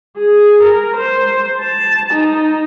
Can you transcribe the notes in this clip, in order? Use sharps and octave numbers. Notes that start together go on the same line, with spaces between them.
G#4
A#4
C5
A5
D#4